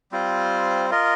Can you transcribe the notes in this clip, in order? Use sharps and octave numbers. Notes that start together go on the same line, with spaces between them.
G3 C4 F4 C5
F4 A#4 D#5